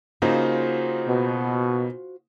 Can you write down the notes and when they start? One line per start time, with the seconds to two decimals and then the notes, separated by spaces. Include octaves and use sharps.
0.22 C#3 A#3 D#4 F4 F#4 C5
1.07 B2